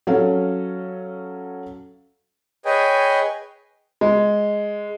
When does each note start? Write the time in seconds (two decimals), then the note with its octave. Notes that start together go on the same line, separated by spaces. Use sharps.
0.07 F#3 C#4 A4 F5
2.65 G#4 B4 C#5 D#5 G5 G#5
4.01 G#3